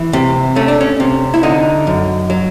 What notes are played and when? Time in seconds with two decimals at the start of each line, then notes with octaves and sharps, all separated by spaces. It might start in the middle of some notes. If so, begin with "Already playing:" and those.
Already playing: E3
0.13 C3
0.56 A3 C#4
0.68 D4
0.81 C#4
1.00 C3
1.34 E4
1.43 D3 D#4
1.87 F#2
2.30 F#3